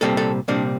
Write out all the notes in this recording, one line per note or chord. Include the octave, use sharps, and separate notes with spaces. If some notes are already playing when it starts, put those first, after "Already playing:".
C2 A#2 G3 C4 A4
A4
C2 A#2 G3 C4 D4